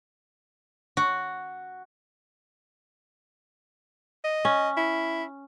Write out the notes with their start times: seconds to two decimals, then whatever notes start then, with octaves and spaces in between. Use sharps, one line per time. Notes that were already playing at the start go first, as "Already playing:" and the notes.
0.97 F#4
4.24 D#5
4.45 C#4
4.77 E4